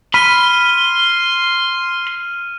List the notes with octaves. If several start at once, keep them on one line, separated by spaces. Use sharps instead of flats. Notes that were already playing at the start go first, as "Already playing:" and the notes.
B5 C6 F6 D#7